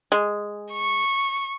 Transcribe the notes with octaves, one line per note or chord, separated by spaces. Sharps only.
G#3
C#6